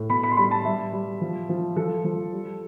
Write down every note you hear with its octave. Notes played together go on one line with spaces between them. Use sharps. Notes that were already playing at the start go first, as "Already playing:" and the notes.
Already playing: A2
B2 B5
B5
C6
G3 B5
A5
G3 E5
G3
F3
F3
F3 A4
F3
G3